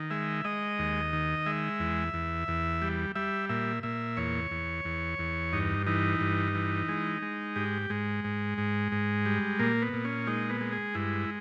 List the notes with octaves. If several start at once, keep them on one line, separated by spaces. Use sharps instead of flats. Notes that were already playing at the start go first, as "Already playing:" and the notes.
Already playing: D#3
G#3 E5
G#3 D#5
D#2
D#3
G#3 E5
E2
E2
E2
G3
G3 E5
A#2 E5
A#2 E5
E2 C#5
E2
E2
E2
G2 D#4
E3 D#4
G2
E3
G#3
G#3
G#2 G4
G#2 G#3
G#2
G#2
G#2
G3
A#2 A#3
B3
A#2
C#4
G#3 D#4
B3
G#3
G#4
G2 E4